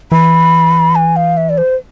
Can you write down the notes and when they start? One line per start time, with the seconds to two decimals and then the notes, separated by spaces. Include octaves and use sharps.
0.12 E3 B5
0.95 G#5
1.16 F5
1.37 E5
1.49 D5
1.58 C5